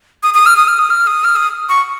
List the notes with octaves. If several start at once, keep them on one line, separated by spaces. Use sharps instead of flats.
D#6
D#6
F6
D#6
F6
D#6
F6
D#6
F6
D#6
C#6